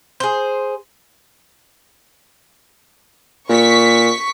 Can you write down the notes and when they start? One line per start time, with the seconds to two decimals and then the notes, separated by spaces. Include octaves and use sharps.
0.20 G#4 C5
3.50 A#2 C#6 B6